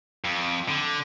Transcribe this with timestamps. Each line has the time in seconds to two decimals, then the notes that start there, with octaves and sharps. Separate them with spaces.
0.24 F2
0.69 D3